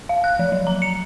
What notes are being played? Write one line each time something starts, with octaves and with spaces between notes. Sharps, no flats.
F5
F#6
F3
F#3
A#5
C#7